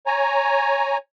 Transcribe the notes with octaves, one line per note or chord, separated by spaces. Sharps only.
C#5 G#5 A#5